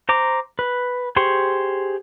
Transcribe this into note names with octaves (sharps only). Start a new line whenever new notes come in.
C5 A#5 D6
B4
G4 G#4 C5 C6 C#6